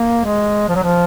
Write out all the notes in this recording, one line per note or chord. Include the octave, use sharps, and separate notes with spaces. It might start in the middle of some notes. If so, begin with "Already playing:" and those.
Already playing: A#3
G#3
F3
F#3
F3